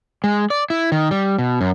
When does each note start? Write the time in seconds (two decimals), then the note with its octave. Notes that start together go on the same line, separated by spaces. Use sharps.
0.24 G#3
0.50 D5
0.70 E4
0.92 D#3
1.11 G3
1.39 B2
1.61 F#2